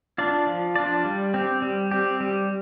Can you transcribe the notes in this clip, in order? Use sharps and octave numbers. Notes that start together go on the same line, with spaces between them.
D4 F4 D5
F3
D4 F4 D5
G3
C4 G4
G3
C4 G4
G3